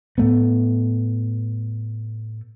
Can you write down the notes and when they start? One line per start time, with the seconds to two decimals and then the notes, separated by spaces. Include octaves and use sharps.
0.18 A2 A3 B3